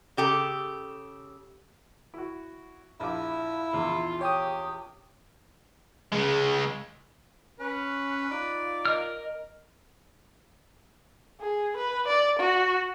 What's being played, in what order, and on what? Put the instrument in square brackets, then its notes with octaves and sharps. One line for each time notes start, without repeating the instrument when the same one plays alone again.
[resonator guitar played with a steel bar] C#3 G4 A4
[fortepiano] E4 F#4
[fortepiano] A#1 F4 D6 [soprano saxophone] E4
[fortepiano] A#1 E2 [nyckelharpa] F4
[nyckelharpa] G4 [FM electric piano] C#5 G5 D#6
[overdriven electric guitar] C#3 G#3
[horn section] C#4 [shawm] B4 [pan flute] F#6
[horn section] D#4 F4 D5
[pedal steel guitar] A#4 F6 [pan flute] D#5
[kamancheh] G#4
B4
D5
F#4